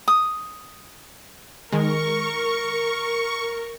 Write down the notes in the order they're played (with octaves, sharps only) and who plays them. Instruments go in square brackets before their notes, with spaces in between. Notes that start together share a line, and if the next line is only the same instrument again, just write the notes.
[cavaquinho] D#6
[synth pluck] D#3 G#3 [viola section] A#4 [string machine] C#6